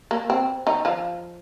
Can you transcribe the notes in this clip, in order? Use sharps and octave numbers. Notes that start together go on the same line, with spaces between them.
A#3
C4
D#3 D#4
F3 F4